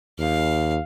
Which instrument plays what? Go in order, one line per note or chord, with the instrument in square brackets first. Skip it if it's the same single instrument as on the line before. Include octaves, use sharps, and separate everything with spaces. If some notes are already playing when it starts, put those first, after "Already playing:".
[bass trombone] D#2 [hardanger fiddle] F5